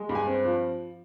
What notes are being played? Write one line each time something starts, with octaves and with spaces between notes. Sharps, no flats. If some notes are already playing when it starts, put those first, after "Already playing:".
Already playing: G#3
G2
G#5
C4
F3